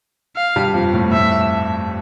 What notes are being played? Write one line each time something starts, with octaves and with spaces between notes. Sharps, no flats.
F5
G2 G3
F2 F3
A2
A2 E5